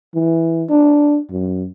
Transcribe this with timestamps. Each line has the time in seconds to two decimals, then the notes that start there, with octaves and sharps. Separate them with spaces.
0.15 E3
0.70 D4
1.31 F#2